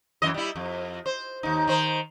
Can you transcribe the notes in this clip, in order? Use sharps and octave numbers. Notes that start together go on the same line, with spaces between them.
F#2 E3 D#5
G3 E4
F2
C5
D#2 D#4
D#3 C5